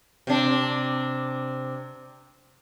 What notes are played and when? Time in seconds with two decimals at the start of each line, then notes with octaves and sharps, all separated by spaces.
0.27 C3 D4